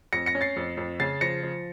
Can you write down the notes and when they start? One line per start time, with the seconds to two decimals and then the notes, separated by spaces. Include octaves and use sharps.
0.13 F2 A#6 C#7
0.26 A#6 C#7
0.35 C#4
0.41 A6 C7
0.56 F2
0.77 F2
1.00 C#3 A6 C7
1.21 F3 A#6 C#7
1.43 F3